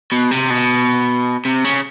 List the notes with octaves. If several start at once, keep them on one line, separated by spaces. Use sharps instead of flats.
B2
C3
B2
C3
C#3